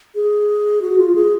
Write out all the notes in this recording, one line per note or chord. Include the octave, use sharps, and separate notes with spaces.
G#4
F#4
F4
G#4